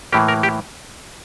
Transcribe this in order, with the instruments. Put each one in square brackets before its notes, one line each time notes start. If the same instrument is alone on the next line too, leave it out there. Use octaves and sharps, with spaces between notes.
[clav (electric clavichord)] A2 E3 A#3 G4
A#4
G4